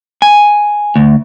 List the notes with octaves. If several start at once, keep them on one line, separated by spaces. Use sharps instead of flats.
G#5
D2